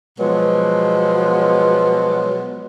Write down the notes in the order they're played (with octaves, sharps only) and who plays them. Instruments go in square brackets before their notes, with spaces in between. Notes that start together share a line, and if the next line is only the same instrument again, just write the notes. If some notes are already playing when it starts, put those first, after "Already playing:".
[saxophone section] B2 F3 F#3 G#3 B3